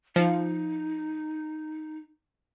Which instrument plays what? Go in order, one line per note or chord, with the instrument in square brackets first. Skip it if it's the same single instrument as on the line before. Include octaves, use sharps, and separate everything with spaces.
[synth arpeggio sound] F3 [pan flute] D#4